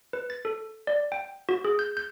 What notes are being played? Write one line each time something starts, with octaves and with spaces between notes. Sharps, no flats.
B4
A6
A4
D5
G5
F#4
G#4
G6
G6